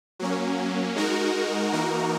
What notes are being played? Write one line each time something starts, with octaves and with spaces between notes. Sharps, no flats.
F#3 A#3 C#4
G#3 D#4 F#4 A#4
E3 A#3 D#4 F#4 A#4